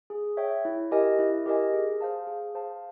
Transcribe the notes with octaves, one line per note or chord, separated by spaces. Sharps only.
G#4
C#5 E5 G5
E4
G4 A#4 D#5 G#5
E4
G4 A#4 D#5 G#5
G#4
C5 F5 A5
G#4
C5 F5 A5